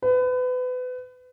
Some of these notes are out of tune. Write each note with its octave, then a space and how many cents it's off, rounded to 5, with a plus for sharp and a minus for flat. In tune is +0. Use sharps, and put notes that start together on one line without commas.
B4 +30